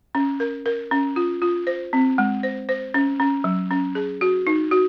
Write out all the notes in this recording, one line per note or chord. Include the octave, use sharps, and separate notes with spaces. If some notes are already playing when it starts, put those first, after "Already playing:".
C#4
A#4
A#4
C#4
F4
F4
C5
C4
G#3
C5
C5
C#4
C#4
F#3
C#4
G#4
F#4
D#4
F#4